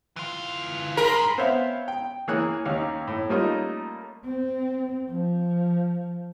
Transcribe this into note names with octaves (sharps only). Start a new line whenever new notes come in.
E3 F4
G#2 G#4 A#4 B5 C6
B3 C4 C5 C#5 E5 F5
G5
E3 A#3 G#4 C#5 F#6
D#2 C#4 D#4 G4 F5
A2
G3 A3 A#3 C#4 D#4 F4
C4
F3